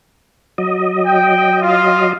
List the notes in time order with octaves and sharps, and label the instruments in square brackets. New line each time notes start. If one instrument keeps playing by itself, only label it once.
[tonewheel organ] F#3 D#5
[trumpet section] G5
F4 F5